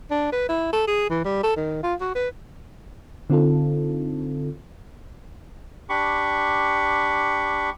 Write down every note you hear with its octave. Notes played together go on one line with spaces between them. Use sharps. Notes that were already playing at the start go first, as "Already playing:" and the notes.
D4
B4
E4
A4
G#4
E3
G3
A4
D#3
F4
F#4
B4
D3 C4 D#4 F4 A4
D4 G4 B5 C#6